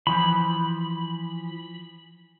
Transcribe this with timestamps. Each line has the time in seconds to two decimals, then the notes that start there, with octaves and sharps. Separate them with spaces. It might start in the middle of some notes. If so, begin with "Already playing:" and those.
0.07 E3 F3 B5